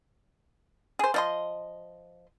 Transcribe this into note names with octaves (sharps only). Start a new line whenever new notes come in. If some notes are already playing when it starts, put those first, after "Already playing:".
G#4 C5
F3 D#5 C6